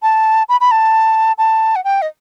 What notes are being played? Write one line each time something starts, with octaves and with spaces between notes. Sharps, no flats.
A5
B5
B5
A5
A5
F#5
G5
D#5